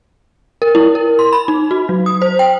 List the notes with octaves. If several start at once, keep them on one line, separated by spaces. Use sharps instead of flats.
A#4
E4
A#4
C6
B5
D#4
F#4
F#3
D#6
C5
G5